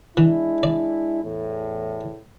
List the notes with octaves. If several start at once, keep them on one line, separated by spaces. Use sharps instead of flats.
E3 G#3 D4 E4
D5
E2 A2